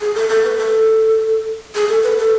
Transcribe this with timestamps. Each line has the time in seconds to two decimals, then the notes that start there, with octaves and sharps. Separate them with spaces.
0.01 G#4
0.15 A4
0.29 A4
0.44 B4
0.58 A4
1.75 G#4
1.89 A4
2.04 B4
2.19 A4